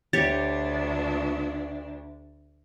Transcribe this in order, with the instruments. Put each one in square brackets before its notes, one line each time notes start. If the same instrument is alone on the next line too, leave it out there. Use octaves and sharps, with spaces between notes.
[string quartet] D2 D4 [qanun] G4 C#5 [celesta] A6